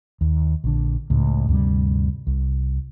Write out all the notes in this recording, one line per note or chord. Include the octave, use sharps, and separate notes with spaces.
D#2
A#1 D3
C#2 A2
D2 G2 C3 G3
C2